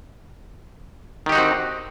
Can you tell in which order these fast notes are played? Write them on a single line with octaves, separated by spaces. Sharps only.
D#3 G4 D#4 F#4 C4